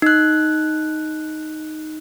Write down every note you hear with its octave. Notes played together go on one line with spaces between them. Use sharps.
D#4 F#6